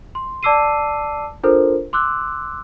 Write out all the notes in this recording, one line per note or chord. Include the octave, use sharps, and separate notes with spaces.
C6
D5 A5 D6 E6 C7 D#7
D4 F4 A4 A#4 C5
C6 D6 E6 F#6